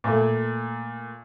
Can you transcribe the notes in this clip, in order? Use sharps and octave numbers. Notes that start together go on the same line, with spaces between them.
A#2 A3